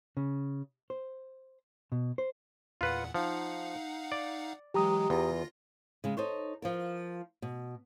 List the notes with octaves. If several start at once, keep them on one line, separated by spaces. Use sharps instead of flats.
C#3
C5
B2
C5
E2 A#2 F4 B4 F#5
F3 D#4 F5 F#5
D5
E3 F#3 G#3 G4 A#5 D#6
E2 F4 A#6
C#3 G#3
D#4 A4 C5 C#5
F3 F4 A#4
B2